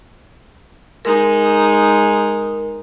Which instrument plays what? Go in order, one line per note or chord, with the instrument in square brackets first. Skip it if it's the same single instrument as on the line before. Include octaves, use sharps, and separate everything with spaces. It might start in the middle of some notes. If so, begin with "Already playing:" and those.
[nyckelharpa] G#3 D#4 [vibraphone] A#4